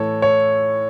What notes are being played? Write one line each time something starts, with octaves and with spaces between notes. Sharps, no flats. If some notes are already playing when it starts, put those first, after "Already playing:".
Already playing: A2 E3 A4 C#5
C#5